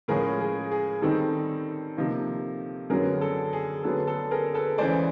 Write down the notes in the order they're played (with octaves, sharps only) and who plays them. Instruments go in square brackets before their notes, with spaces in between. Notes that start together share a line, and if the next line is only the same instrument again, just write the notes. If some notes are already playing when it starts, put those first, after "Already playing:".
[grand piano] A2 F3 G#3 C#4 G#4 A#4
G#4
G#4
D#3 G3 C4 D#4 A4
C3 F3 A#3 D#4
F#2 D3 F#3 B3 G#4 A#4
A4
G#4
D3 F#3 B3 A4
A4
G#4 A#4
A4 B4
C#3 E3 G#3 C5 D5